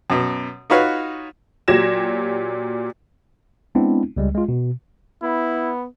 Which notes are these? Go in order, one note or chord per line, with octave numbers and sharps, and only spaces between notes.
F#2 B2
D#4 F4 F#4 B4 C#5 F5
A#2 F#3 G4 G#6 A#6 E7
G#3 B3 C4 D4 E4
C#2 G3 G#3
G#3 F4
B2
B3 E4